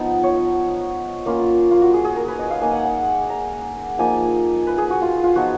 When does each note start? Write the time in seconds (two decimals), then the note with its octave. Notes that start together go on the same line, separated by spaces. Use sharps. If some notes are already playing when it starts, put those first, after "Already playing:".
Already playing: F3 B3 D#4
0.23 C#5
1.26 A#3 C#4 F4
1.71 F4
1.82 F#4
1.93 G#4
2.04 G#4
2.16 A#4
2.28 B4
2.39 D#5
2.51 F5
2.61 A#3 D#4 G#5
2.73 F#5
2.85 F#5
3.30 A#5
3.98 F3 A#3 D#4 G#5
4.67 B4
4.78 G#4
4.90 F#4
5.02 F4
5.24 F4
5.35 F3 B3 D#4 F#4